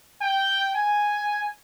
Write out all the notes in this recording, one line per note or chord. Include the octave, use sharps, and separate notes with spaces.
G5
G#5